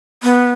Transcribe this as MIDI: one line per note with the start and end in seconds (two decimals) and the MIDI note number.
0.23 0.53 59